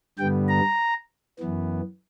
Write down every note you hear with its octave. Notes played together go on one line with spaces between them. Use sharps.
G2 D3 G3 B3 G5
A#5
F#2 E3 B3